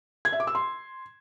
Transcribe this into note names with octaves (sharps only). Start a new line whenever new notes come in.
G#6
E5
D6
E6
C6